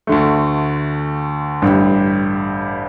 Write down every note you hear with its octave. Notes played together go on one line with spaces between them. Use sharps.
D2 D3 A3
A1 G2 D3 G3